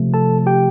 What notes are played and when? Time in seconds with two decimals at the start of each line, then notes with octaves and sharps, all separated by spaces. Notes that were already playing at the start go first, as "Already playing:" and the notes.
Already playing: C3 F3 A3
0.14 A4 A5
0.46 G4 G5